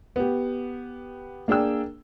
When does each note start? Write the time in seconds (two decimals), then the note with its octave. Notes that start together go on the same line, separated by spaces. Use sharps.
0.16 B3 G4
1.48 A#3 D4 G#4 G5 E6